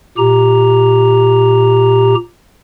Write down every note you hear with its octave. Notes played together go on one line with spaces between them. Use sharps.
A#2 G4 A#5